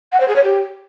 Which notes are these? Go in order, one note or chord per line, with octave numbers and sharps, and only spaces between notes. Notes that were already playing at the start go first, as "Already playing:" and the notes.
F#5
C5
G#4
C#5
G4